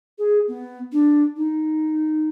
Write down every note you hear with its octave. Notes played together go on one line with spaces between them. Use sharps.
G#4
B3
D4
D#4